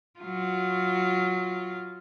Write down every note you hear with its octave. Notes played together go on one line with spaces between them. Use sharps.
F#3 F4